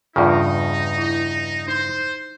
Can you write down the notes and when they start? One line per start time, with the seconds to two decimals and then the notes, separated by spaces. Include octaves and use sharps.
0.16 E2 G2 C#3 D#4 F4 G#4
0.98 E4
1.68 D#4 C5